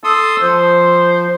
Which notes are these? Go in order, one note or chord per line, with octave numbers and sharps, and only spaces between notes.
A4 C6 D#6 E6
F3 C5